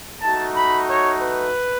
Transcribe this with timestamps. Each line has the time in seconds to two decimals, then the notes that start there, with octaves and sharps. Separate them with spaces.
0.19 A3 D#4 F#4 A5
0.53 B5
0.86 C#5
1.20 B4